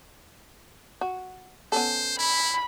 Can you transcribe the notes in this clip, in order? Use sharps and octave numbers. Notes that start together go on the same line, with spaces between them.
F#4
B3 C#4 A4 C5
E4 B5